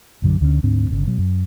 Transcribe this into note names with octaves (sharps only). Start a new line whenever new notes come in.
B1 F#2 D3 F#3
D2 D3 D#3 C#4
D2 G#2 C4 D4
G1 C#3
B2 F#3
F#2